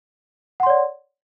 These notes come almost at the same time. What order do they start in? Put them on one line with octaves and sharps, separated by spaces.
F#5 C6 C#5 D5